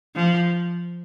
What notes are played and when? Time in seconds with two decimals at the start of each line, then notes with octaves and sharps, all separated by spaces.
0.16 F3